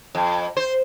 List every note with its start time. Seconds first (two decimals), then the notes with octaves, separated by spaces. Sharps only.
0.15 F2
0.57 C5